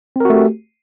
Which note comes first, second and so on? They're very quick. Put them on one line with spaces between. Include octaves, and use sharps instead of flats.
C4 A#4 F#4 A3 G4